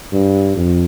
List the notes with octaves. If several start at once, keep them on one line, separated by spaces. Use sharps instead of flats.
G2
F2